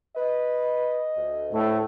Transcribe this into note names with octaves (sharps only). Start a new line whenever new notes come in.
B4 D#5
D2
A2 A3